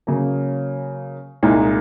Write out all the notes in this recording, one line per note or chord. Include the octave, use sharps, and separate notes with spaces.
C#3 F#3 A#3
C2 A#2 G#3 D#4